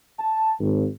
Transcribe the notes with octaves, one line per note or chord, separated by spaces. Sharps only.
A5
G#1